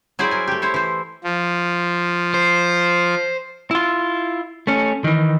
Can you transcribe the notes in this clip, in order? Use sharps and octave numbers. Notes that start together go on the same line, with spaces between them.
F#3 E4 G#4 C5 D5
A#4 G#5
A3 G4
E4 C5 C#5
E3 C5
F3
C5
E4 F4
A3 C#4
D#3 E3